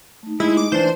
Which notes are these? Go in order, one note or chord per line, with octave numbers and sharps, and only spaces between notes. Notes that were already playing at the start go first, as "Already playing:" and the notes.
A3 D#4
G#3 E4
D6
E3 D4 C5